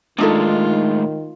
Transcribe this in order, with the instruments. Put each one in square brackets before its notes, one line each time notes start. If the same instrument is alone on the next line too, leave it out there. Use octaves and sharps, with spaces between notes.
[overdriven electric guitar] A2 G#3 [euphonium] D#3 [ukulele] D4 D#4 A4 [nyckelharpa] F4